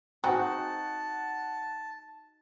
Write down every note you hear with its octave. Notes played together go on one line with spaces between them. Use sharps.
C4 D#4 F#4 G#4 F#5 A5